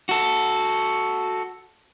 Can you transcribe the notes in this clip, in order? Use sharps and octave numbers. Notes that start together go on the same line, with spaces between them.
F#4 A4